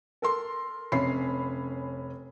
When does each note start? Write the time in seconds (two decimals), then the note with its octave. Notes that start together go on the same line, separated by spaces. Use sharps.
0.22 A4 A#4 C6
0.92 F1 C#4 B5 C7